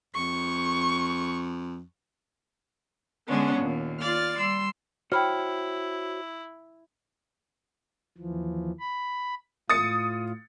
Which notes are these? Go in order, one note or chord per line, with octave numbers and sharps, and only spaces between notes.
F2 C#6
D3 G#3 B3 C#4 D4
D#2 A#2
F4 D5 F6 A6
G3 C6 E6
E4 F#4 C5 C#5 G5 B5 F6
D#2 E3 F3
B5
A2 F4 D#6 A6 C#7